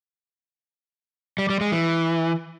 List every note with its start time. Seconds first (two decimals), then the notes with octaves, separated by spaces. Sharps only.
1.38 G3
1.50 G3
1.61 G#3
1.72 E3